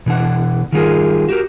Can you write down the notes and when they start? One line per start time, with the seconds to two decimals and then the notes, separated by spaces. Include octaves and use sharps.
0.06 B2 E3 D4 F#5
0.72 D#3 G3 G#3 F4 G#4 A#4
1.29 F#4 G4 A#4